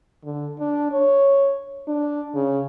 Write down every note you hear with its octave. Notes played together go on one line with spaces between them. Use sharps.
D3
D4
C#5
D4
C#3